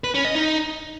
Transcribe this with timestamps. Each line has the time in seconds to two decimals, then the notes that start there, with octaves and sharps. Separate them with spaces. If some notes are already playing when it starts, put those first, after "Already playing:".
0.04 B4
0.14 C#4
0.25 D#5
0.35 D#4